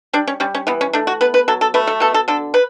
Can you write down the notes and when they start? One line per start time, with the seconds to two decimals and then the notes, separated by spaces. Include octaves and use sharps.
0.13 G3 D4
0.27 C#4
0.40 G3 C#4
0.54 C#4
0.67 E3 B3
0.81 C#4
0.93 A3 D4
1.07 F#4
1.21 B3 B4
1.34 B4
1.48 F#3 A4
1.61 A4
1.74 A3 B4
1.87 A4
2.00 B2 A4
2.14 A4
2.28 D3 A4
2.54 B4